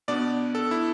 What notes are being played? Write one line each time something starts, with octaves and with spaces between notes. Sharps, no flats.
B2 B3 D4 D5
A4
E4